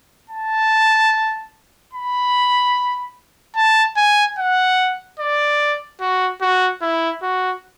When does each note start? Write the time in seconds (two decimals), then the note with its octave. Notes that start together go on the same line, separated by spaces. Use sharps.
0.30 A5
1.94 B5
3.56 A5
3.97 G#5
4.38 F#5
5.20 D5
6.01 F#4
6.42 F#4
6.82 E4
7.23 F#4